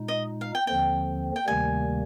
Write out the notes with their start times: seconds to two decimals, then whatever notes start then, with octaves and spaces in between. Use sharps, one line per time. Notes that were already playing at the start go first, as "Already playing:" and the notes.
Already playing: A#2 G#3 D#4
0.08 D#5
0.41 F5
0.55 G5
0.67 D#2 D3 F3 C4 G5
1.36 G5
1.47 D2 C3 D#3 G3 A#3 G#5